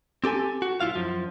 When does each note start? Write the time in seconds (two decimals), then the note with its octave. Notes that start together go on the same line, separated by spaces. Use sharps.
0.24 C4 G4 A4 G#5
0.62 F#4
0.80 C2 E4 F4 F5
0.96 F#2 F3